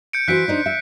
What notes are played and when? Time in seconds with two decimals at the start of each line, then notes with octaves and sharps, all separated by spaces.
0.13 G6 C#7 D7
0.28 E3 F#4 C5 F#6 B6 D7
0.48 D4 D#4 C5
0.66 E5